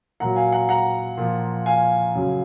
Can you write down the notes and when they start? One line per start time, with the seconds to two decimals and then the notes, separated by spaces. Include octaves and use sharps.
0.20 A#2 F#3 F#5 A#5
0.36 F5 G#5
0.52 F#5 A#5
0.69 F#5 A#5
1.17 A#2 F3
1.66 F5 G#5
2.15 F#2 C#3 F#3